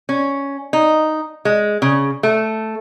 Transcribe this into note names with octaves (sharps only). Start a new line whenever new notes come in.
C#4
D#4
G#3
C#3
A3